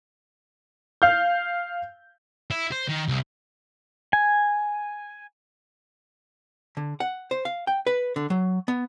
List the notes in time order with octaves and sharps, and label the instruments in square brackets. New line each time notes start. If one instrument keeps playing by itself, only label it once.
[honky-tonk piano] F5 G6
[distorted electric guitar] E4
C5
D#3
C2
[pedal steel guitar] G#5
[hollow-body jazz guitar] D3
F#5
C5
F5
G5
B4
D3
F#3
B3